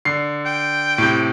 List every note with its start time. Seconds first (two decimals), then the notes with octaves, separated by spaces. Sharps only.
0.05 D3 C7
0.45 G5
0.98 A2 C3